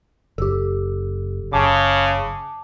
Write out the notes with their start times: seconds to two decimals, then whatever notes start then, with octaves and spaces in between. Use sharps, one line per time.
0.38 F#1 G4 A4
1.53 F#1 C#3 A5 D6